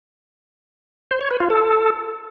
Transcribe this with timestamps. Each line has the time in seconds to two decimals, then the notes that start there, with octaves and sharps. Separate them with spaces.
1.11 C5
1.21 C#5
1.31 B4
1.40 F4
1.50 A4